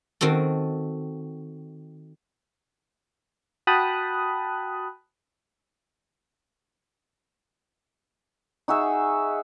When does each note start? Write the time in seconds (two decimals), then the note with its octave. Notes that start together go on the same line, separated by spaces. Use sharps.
0.21 D#3 C4 F#4 A4
3.67 F#4 G5 A5 B5 D#6 F#6
8.68 D#4 F#4 G#4 E5